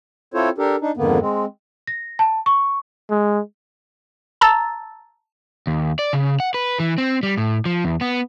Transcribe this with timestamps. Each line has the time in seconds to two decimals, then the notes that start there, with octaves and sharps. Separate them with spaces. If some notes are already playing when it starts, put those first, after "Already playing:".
0.34 C4 E4 F4 A4 C5 C#5
0.58 D4 G4 A4 A#4
0.81 D4 D#4
0.97 F2 G#2 D3 D#3 A#3 B3
1.20 G#3 C4
1.87 A#6
2.19 A5
2.46 C#6
3.10 G#3
4.41 A5 A#5 E6 A6
5.67 D#2
5.99 D5
6.13 C#3
6.40 F#5
6.54 B4
6.80 E3
6.98 C4
7.23 G3
7.38 A2
7.66 F3
7.85 E2
8.01 B3